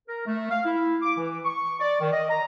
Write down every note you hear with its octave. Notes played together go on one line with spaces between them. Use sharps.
A#4
A3
F5
E4
D6
E3
C#6
D5
D#3
D#5
A#5